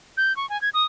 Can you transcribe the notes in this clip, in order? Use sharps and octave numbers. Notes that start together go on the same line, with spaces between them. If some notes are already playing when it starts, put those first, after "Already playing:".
G6
C#6
G#5
G#6
D#6